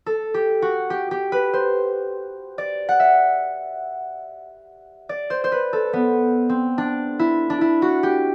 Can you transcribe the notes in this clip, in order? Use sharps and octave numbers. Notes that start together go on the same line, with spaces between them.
A4
G4
F#4
G4
G4
B4
C5
D5
F#5
E5
D5
C5
C5
B4
A4
B3
C4
D4
E4
D4
E4
F#4
G4